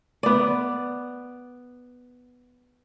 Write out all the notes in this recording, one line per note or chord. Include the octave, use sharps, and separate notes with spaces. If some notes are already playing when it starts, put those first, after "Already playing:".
B3 D5